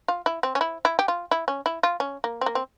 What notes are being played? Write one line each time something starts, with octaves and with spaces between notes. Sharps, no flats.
F4
E4
C4
C#4
E4
E4
G4
F4
E4
C#4
E4
F4
C#4
A#3
C4
A#3
C4